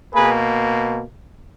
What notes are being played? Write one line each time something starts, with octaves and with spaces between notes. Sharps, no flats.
B2 A#3 G#4 B4